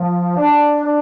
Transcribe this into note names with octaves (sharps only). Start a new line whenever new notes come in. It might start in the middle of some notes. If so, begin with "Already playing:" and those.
Already playing: F3
D4
D4